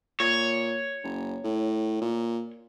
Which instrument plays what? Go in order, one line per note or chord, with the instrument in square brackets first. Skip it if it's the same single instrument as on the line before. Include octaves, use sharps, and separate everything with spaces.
[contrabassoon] A#2 [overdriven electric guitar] C#5
[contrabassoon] F#1
A2
A#2